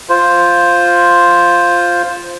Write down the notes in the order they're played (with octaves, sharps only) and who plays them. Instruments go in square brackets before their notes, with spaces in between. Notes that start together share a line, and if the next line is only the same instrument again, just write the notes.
[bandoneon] F4 C5